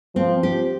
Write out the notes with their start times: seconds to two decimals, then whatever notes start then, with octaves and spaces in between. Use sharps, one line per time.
0.16 F3 C4
0.43 G4